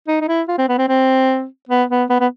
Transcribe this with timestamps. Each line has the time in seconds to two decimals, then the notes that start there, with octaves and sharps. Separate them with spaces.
0.08 D#4
0.21 D#4
0.28 E4
0.48 F4
0.58 C4
0.69 B3
0.78 C4
0.88 C4
1.69 B3
1.90 B3
2.10 B3
2.20 B3